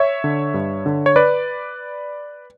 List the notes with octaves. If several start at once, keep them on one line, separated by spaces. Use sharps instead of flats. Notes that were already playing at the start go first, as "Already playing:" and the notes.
Already playing: C#5 E5
D3
G2
D3
C#5
B4 D5